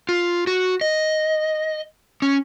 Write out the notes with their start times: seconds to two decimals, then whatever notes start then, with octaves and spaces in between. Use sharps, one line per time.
0.09 F4
0.47 F#4
0.81 D#5
2.22 C#4